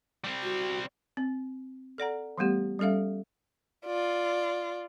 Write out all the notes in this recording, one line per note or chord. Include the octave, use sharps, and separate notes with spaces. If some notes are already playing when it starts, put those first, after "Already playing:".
G3 C4
F#4
C4
A4 D5 F#5 A#5
E3 G3 A3 B3 G4
G3 C#4 A4 E5 F5
F4 D5